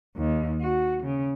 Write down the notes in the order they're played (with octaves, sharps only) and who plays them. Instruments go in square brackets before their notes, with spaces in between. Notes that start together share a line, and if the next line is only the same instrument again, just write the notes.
[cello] D#2
F#4
C#3